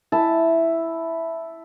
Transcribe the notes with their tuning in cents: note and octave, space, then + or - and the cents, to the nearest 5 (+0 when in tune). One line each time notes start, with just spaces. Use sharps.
E4 +0 A5 +0